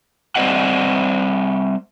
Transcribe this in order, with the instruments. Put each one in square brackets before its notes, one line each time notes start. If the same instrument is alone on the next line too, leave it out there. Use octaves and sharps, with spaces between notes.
[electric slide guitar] G3 C4 C5 D5 D#5 F#5